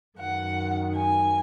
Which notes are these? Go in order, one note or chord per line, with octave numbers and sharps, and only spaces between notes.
F#2 D#3 F#5
G#5